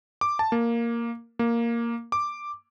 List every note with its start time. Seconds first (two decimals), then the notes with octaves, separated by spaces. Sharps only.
0.21 D6
0.39 A5
0.52 A#3
1.39 A#3
2.12 D6